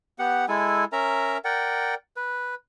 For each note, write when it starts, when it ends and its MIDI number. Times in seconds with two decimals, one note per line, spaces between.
0.19 0.45 59
0.19 0.45 67
0.19 0.45 78
0.48 0.85 56
0.48 0.85 64
0.48 0.85 69
0.48 0.85 80
0.93 1.38 61
0.93 1.38 70
0.93 1.38 76
0.93 1.38 82
1.45 1.94 70
1.45 1.94 74
1.45 1.94 78
1.45 1.94 79
2.16 2.55 71